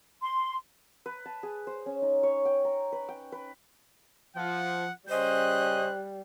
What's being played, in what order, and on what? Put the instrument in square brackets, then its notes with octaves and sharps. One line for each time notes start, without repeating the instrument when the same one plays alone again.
[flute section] C6
[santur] B4
A5
G#4
C5
C#4
D#4
C#5
G5
A#5
B4
G5
B4
[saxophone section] F3 [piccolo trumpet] F#5
[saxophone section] C#3 C#4 D#5 [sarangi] G3 [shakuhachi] C5 [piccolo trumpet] F#6